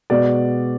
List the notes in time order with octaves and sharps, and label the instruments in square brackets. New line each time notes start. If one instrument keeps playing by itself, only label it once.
[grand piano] B2 G#3 B3 D5